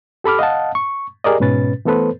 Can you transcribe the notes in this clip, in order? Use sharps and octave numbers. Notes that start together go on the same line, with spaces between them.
G4 A4 B5 D6 F6
D#5 F5 F#5 A5
C#6
G4 G#4 A#4 D5 D#5
G#2 B2 C#4 B4 A6
E3 A3 B3 A4 B4 C5